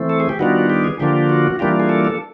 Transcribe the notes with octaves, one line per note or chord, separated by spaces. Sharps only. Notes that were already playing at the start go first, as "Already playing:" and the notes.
Already playing: E3 A3 C4
A4
G#4
G4
D#3 G3 B3 D4 F4 F#4
G4
G#4
D3 F3 A#3 D4 F4 G4
F#4
E3 G3 A#3 D4 F4 G4
G#4
A4
A4